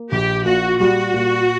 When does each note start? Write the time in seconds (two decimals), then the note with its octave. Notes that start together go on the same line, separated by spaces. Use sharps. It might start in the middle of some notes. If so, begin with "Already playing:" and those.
Already playing: A#3
0.12 A#1 G4
0.46 A#2 F#4
0.80 G3 F#4
1.14 A#2